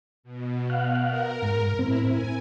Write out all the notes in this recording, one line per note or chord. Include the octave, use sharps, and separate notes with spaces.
B2
F5 F#5
A#4
G#2
A2 C4 E4
G#5